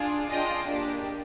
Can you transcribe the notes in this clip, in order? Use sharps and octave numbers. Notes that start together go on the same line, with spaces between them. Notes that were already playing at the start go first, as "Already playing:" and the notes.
Already playing: D4 F4 G#4
D4 F4 G#4 D#5 G5
A#3 D4 G4